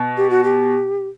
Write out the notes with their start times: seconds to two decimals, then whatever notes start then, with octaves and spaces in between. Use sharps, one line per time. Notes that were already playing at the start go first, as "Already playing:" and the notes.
Already playing: B2
0.17 G4
0.30 F#4
0.44 G4